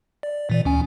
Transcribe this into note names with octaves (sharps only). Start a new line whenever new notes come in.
D5
A#2 E3 D5
D2 C#4 G#5